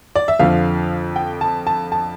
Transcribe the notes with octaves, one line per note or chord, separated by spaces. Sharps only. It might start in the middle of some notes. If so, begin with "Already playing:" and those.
D5
E5
F2 D3 F3 F5
G5
A5
A5
A5